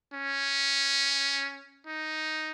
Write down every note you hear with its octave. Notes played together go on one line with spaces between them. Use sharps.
C#4
D#4